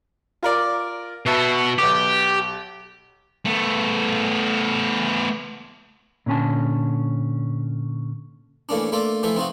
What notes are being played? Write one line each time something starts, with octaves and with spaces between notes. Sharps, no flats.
F4 A#4 D5
B2 F#4 B4 E5 A5
B1 G4 B4 D6
A3 B3
A#2 D3 C#4 G#5 A5
E3 A3 A#3 C#4 D4
A3 A#3 D4 F4 A4
E3 F3 A3 F4 E5
C4 D#4 F4 F#4